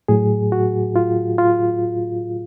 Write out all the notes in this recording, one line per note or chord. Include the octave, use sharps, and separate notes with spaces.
A2 F#3 G#4
F#4
F4
F4